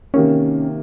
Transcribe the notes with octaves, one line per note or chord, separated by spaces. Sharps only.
C3 D#3 A#3 C#4